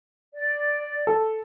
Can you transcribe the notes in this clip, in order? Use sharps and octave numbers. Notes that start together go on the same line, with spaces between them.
D5
A4